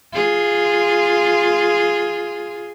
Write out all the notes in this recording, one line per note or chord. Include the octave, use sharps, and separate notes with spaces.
F4 G#4